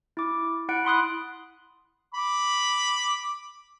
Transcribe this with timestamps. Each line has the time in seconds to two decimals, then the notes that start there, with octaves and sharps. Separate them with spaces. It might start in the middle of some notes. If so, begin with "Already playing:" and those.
0.17 E4 D6
0.69 E4 F#5 F#6 D7
0.85 B5 C6 D#6 F#6
2.15 B5 D6